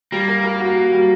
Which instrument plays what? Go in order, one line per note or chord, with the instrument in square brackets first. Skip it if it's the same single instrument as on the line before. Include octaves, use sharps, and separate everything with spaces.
[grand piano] G3 [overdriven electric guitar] A#3
[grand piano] A#4
A#4
F#4
F#4
G3